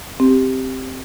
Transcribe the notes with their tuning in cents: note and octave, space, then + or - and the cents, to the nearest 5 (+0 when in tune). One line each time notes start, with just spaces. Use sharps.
C4 +0 G4 +0